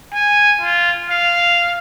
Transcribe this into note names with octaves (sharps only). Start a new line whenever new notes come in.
G#5
F4
F5